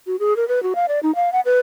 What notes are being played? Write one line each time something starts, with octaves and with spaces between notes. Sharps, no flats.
F#4
G#4
A#4
B4
F#4
F5
D5
D#4
F5
F#5
B4